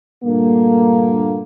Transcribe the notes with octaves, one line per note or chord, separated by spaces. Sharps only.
G2 A#2 D3 A3 A#3